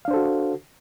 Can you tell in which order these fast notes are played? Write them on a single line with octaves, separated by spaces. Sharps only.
F5 D4 C5 A4 F#4